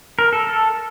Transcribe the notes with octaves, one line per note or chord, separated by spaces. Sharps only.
A#4
A4
A4